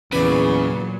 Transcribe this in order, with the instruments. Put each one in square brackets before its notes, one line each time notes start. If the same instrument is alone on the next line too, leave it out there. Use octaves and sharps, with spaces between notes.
[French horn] E2 [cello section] A#2 F#3 [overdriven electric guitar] C#3 [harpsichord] B4 D5